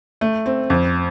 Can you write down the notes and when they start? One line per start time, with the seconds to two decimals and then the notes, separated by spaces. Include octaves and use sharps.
0.21 A3
0.46 C4
0.70 F2